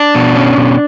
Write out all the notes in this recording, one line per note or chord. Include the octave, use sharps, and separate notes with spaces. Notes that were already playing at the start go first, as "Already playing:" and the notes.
Already playing: D4
B2
C#4
B2